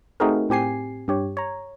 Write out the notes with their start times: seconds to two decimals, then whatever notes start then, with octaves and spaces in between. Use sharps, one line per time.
0.20 A3 C4 D#4 F#4 G#4 A#4
0.49 A2 C4 G4 G#5 C7
1.08 G2 G4 C#5
1.37 C#5 A#5